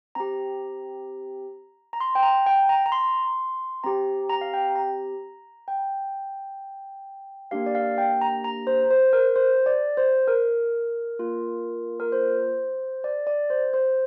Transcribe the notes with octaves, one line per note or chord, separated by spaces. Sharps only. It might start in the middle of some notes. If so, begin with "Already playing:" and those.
C4 G4 A#5
A#5
C6
G5
A#5
G5
A#5
A#5
C6
C4 G4 A#5
A#5
F5
G5
A#5
G5
A#3 D4 G4 F5
D5
F5
G5
A#5
A#5
C5
C5
A#4
C5
D5
C5
A#4
A#3 F4
A#4
C5
D5
D5
C5
C5